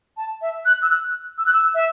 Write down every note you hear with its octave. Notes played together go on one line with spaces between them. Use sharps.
A5
E5
F#6
E6
F#6
E6
F#6
E6
E5